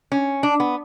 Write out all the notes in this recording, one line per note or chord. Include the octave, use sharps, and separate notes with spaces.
C#4
D4
B3